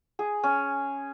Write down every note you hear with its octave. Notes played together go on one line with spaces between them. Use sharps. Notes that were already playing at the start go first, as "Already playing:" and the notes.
G#4
C#4